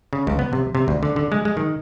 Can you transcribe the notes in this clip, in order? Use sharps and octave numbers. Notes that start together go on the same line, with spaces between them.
C#3
C#2
B3
C3
C3
D2
D3
D3
G#3
G#3
D#3